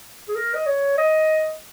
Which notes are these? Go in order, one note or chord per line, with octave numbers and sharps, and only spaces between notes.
G#4
A#4
D#5
C#5
D#5